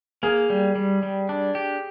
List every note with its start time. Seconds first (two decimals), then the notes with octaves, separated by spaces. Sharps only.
0.23 A#3 G#4
0.50 G3
0.76 G3
1.03 G3
1.29 D4
1.55 G4